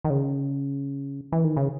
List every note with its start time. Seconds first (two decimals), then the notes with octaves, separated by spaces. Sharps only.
0.05 D#3
0.10 C#3
1.32 E3
1.44 D#3
1.57 C#3